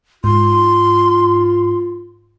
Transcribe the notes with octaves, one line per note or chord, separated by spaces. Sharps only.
G#2 F4 C6